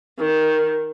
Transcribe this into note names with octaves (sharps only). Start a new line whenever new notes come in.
D#3